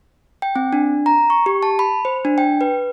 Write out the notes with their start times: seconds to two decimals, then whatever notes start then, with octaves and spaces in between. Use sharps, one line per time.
0.42 G5
0.56 C4
0.73 D4
1.06 A#5
1.30 C#6
1.46 G4
1.63 A5
1.79 B5
2.05 C5
2.25 D4
2.38 G5
2.61 B4